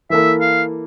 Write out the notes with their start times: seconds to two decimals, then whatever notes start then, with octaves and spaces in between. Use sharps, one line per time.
0.10 E3 A#3 E4 A4 E5
0.41 F5